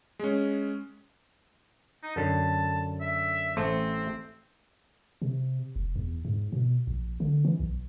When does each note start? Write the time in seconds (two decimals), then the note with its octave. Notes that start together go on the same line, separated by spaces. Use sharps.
0.19 G#3 C#4
2.03 D#4
2.16 F#2 D3 A5
3.01 E5
3.57 A1 A3 C4 C5
5.22 C3
5.76 F1
5.96 E2
6.25 G#2
6.52 B2
6.87 A#1
7.20 D3
7.45 E3
7.60 B1